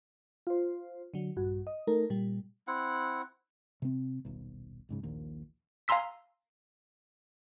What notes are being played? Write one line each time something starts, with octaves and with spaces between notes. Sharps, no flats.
F4 C5
D3 F#3
A#1 G2 F#4
D#5
A3 D#4 A4 A#4
A#2 G3
C4 E4 F#5
C3 C4
D#1 B1
D1 G#2 C#3
A#1 D#2 A#2
F5 G#5 A#5 C6 E6 B6